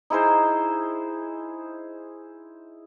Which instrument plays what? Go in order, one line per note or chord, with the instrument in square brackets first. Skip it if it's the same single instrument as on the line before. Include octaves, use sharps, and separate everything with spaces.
[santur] D#4 E4 G#4 C5